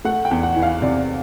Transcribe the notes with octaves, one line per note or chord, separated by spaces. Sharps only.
A3 F#5
G5
E2
F#5
E3
F5
C3 D5